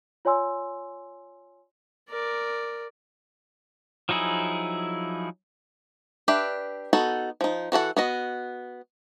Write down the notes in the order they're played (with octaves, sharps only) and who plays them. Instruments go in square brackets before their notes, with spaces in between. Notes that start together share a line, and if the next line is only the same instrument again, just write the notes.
[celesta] F4 C#5 D5 G#5 C6 E6
[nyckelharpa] A#4 D5
[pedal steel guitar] F3 F#3 D#4 E4 G#4
[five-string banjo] D4 G4 B4 E5
B3 D#4 F#4 A4
F3 D#4
E3 F#4 A4 F#5
B3 F#4 D#5